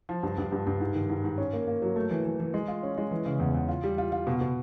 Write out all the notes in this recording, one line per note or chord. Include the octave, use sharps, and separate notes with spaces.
F3
G2
G2
G2
G2
G#2
D#3
G#2
G#2
C#4
A#3
A#3
F#3
A3
E3
E3
E3
G#3
F4
C#4
G#3
E3
C#3
E2
E2
F4
G3
F4
F4
B2
B2